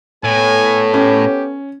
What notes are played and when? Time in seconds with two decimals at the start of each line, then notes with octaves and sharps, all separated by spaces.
0.24 A2 B3 A4 C#5 G#5
0.94 C#4 G4